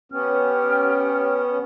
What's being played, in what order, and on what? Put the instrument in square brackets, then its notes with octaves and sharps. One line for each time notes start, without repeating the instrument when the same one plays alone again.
[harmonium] B3 C#4 [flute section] G4 G5 F6